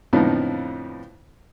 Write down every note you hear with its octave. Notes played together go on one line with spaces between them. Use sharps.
F2 A2 D3 F3 B3 D#4